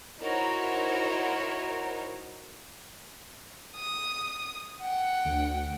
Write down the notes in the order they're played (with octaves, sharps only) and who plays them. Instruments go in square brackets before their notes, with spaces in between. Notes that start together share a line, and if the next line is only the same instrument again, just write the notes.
[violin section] D#4 E4 F#4 A#4 C5 C#5
[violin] D#6
F#5 G5
[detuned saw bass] D2